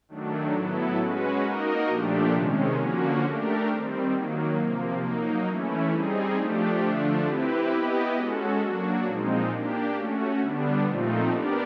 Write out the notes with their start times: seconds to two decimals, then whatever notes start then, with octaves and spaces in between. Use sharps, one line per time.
0.08 D#3 F#3 A3 D4
0.53 A2 F#3 B3 E4 A4
0.99 G#3 C#4 F#4 B4
1.43 A#3 D#4 F#4 A#4 D#5
1.88 A#2 F3 A3 D4 G4
2.33 C3 D#3 G#3 C#4
2.78 D3 F3 A#3 C#4 F#4
3.23 A3 D4 G4 A#4
3.68 D#3 G3 C4
4.12 D#3 F#3 A#3
4.57 C3 F3 A#3
5.02 F#3 A#3 D#4
5.47 E3 A3 C#4 E4
5.92 G3 C4 D#4 G#4
6.36 F3 A3 D4 G4
6.81 D3 F3 A3 D4
7.26 C4 E4 G4 B4
7.71 B3 E4 G4 B4 D#5
8.16 G#3 C#4 F#4 A4
8.60 F#3 A#3 D4 F#4
9.05 A#2 F3 G#3 C4 D#4
9.50 A#3 D4 G4
9.95 A3 C#4 F#4
10.40 D3 G3 B3 D4
10.85 A#2 F3 A3 C4 D#4
11.30 B3 D4 G4 A#4 D5